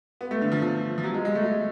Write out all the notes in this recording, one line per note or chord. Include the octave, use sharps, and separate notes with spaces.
B3
A3
D3
F3
F3
F3
F#3
G#3
G#3
A3
G#3